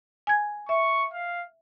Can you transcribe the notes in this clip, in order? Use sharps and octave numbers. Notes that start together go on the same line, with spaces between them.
G#5 G#6
E5 C#6
F5